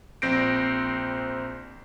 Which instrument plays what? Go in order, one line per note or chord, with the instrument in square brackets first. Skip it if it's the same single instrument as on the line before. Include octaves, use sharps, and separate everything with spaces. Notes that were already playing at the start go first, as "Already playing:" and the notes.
[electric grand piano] A#1 C4 G6 A#6 C7 D7